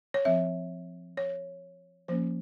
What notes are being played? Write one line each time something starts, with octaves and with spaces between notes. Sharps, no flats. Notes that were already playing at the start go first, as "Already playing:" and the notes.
C#5
F3 C4 E5
C#5
F3 A#3 C#4 C5